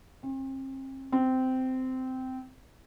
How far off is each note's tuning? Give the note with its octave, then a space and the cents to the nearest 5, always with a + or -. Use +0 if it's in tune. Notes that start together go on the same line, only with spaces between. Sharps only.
C4 +40
C4 -15